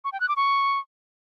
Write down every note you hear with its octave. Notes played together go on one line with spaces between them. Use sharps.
C#6
G5
F#6
D6
C#6